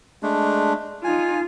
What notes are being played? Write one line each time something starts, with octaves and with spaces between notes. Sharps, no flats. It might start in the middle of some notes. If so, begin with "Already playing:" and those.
G#3 A3 D4
D#4 F4 G#5